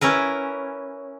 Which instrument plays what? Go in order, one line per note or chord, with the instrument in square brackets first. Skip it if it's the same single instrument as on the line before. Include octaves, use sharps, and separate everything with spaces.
[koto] C#4 E4 A#4 B4